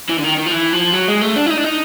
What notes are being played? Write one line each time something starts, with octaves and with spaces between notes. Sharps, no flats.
E3
D3
D#3
D#3
F3
E3
F3
F#3
G#3
A3
D4
E4
D#4
D4
D#4